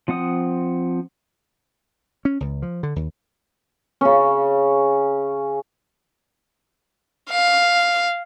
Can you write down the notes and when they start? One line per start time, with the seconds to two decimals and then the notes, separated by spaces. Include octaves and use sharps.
0.08 F3 C4 F#5 D#6
2.25 C#4
2.40 C#2
2.62 F3
2.83 D3
2.96 D#2
4.01 C#3 C#4
7.31 F5